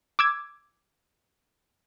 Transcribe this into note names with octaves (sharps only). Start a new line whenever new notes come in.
D6 E6 G#6